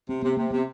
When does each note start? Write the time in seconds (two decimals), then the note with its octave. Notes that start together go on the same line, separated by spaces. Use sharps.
0.09 C3 C4
0.22 C3 B3
0.37 C3 A#3
0.51 C3 B3